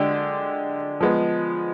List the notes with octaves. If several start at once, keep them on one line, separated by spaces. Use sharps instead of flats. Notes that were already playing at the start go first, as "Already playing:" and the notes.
Already playing: D3 G#3 D4 G4 D5
F3 G#3 B3